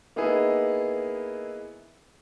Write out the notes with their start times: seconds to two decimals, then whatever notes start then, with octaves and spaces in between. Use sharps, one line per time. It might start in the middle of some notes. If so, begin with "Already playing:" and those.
0.16 A#3 B3 D#4 E4 G#4